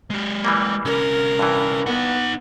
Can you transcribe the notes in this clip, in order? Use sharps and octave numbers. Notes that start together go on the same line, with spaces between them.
G#3 G4
E3 G3 A#3
C2 C#4 A#4
G2 E3
B3 D#4 F#5